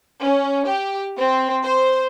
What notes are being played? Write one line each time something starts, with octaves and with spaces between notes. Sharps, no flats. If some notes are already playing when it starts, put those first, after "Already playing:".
C#4
G4
C4
C5